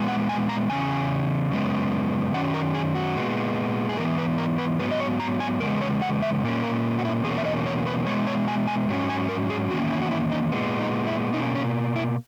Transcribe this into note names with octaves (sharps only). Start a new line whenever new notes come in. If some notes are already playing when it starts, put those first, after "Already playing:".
Already playing: A#2 G#3 B3
F#5
G#5
A#5
E2 C#3 C#4 G#5
F#2 C#3 G#3 B3
F#2 D#3 F#3 C#4 F#5
A#4
G#4
F#4
A#2 G#3 B3
G#4
G#2 E3 B3 A#4
B4
A#4
B4
G#2 F#3 B3 B4
D#5
C#5
A#5
G#5
E2 C#3 G#3 B3 A#4
C#5
F#5
E5
A#2 A#3 C#4
A#4
F#4
E4
E2 B2 A#3 C#4 G#4
E5
D#5
C#5
B4
B2 G#3 B3 C#5
C#5
G#5
G#5
G#2 F#3 C#4
G#5
A#4
G#4
E2 D#3 A#3 C#4 F#4
E4
F#4
E4
D#4
A#2 G#3 B3
D#4
E4
B2 A#3 C#4 D#4
C#4
E4